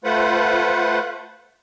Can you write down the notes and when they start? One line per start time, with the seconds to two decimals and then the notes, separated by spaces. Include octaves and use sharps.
0.04 A3 F4 B4 C5 F#5